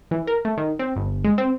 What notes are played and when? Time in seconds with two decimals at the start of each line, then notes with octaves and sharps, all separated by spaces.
0.11 E3
0.27 A#4
0.45 A3
0.58 D#3
0.79 C4
0.96 G1
1.24 G#3
1.38 C4